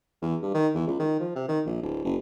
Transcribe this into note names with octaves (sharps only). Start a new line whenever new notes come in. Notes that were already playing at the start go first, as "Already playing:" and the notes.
E2
G2
D#3
E2
C#2
D#3
F3
C3
D#3
A#1
D1
F#1